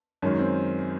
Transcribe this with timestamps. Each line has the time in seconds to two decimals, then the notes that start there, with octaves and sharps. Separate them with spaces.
0.22 F#2 D#3 G#3 C#4
0.39 C4